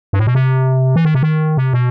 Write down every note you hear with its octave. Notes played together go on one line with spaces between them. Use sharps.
G2
A2
B2
C3
E3
D#3
C3
D#3
C3
B2